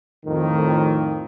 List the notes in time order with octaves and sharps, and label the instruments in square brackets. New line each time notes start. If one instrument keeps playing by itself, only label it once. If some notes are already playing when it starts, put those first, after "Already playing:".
[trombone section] F2 A2 D#3